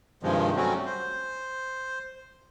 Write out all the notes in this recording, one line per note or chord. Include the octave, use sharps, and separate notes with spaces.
G2 C3 D#3 F3 G#3
F#3 G3 A3 C4 C#4 F#4
C5